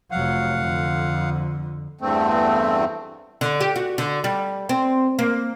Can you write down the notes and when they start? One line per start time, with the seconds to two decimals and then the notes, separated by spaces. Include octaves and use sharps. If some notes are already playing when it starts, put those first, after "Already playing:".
0.11 F1 F#3 F5 F#5
0.59 F2 D3
2.01 E2 G2 A3 C4
3.41 D3
3.60 G4
3.76 F#4
3.98 D3
4.24 G3
4.69 C4
5.19 A#3